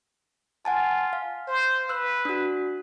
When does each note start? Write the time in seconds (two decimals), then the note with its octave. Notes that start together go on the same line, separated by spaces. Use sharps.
0.65 F4 F#5 G#5 A5
1.13 F5
1.48 C5
1.89 B4 E6 F#6
2.25 D4 F#4